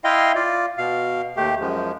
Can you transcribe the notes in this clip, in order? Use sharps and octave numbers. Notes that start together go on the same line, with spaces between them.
E4 D#5 F5 G5 C6
F4 D5
B2 F5
D#2 A3 G4
F#2 F3 G#3